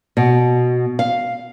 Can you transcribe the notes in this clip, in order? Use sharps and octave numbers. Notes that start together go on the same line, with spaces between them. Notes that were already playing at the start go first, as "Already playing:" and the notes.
B2
F5